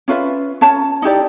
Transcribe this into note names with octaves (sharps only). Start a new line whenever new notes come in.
C#4 F4 B4 E5
C#4 C#5 A5
D#4 E4 G4 D5